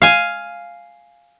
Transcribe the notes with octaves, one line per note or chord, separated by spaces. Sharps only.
F5 G#5